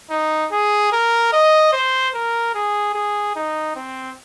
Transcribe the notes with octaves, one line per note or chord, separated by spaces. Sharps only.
D#4
G#4
A#4
D#5
C5
A#4
G#4
G#4
D#4
C4